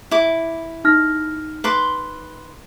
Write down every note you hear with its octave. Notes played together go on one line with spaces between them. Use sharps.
E4 D6
D#4 F6 A#6
B4 C6 D6